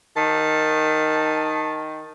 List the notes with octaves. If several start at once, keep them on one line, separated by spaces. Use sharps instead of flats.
D#3 A5